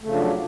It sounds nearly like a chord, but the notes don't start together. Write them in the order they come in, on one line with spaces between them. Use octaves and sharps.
A3 C#3 F3 D4 F#3